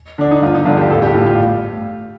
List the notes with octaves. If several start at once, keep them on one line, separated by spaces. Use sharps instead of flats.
D3 D4
D#4
G1 F4
D#4
G2 D3 F4
G4
A1 A4
G4
A2 F4
F4